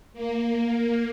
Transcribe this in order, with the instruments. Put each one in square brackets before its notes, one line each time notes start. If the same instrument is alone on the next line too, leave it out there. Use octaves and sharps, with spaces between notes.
[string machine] A#3